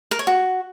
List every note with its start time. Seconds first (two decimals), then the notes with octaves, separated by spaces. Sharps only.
0.11 A#4
0.19 C#5
0.27 F#4